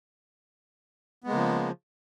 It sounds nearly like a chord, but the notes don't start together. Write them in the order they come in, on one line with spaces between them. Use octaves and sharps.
B3 G#3 A#3 C#3 F3